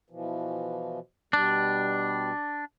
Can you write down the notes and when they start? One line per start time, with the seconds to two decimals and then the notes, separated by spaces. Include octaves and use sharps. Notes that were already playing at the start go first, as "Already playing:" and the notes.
0.10 B2 E3 F3
1.33 B2 G3 D4